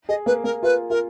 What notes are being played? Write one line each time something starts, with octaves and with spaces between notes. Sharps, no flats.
G#4 D#5
A#3 B4
A#3 A#4
F4 B4
F4 A#4